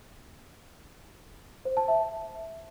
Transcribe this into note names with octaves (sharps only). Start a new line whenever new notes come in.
C5
A5
E5